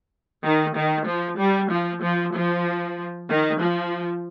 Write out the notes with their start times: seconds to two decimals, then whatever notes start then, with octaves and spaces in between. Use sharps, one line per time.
0.44 D#3
0.76 D#3
1.07 F3
1.38 G3
1.71 F3
2.03 F3
2.35 F3
3.29 D#3
3.61 F3